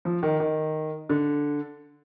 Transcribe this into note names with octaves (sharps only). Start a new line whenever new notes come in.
F3
D#3
D#3
D3